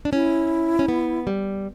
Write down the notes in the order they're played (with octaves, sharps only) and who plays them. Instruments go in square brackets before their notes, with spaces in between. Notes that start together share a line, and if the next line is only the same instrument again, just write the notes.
[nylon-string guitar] D4
[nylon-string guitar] C#4 [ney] E4
[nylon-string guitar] C#4
B3
G3